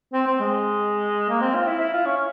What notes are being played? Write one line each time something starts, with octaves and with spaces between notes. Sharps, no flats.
C4
C4
G#3
A#3
C4
F4
E4
E4
F4
C#4